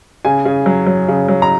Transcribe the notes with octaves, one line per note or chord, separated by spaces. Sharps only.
C#3 G#5
C#3
F#3
F#3
C#3
F#3
A#5